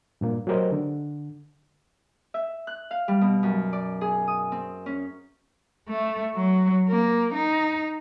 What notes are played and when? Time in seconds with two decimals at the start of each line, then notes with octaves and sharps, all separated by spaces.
0.21 G2 A#2 A#3
0.47 F#3 A3 G4 A#4 C5 D#5
0.72 D3
2.34 E5
2.67 F#6
2.91 F5
3.08 G3
3.21 B2
3.43 F#2
3.73 D5
4.01 G#4
4.28 D#6
4.52 C4
4.86 C#4
5.89 A3
6.35 F#3
6.90 A#3
7.34 D#4